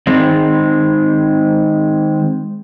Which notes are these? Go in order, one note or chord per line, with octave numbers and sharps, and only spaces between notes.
D#3 G#3 C4